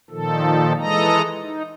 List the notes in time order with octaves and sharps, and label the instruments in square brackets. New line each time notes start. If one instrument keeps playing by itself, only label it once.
[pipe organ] A#2 D#3 F3 A4
E3 G#3 A4 D#5 A#5
D#4